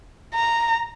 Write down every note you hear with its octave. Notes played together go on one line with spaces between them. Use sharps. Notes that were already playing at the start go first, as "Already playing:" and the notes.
A#5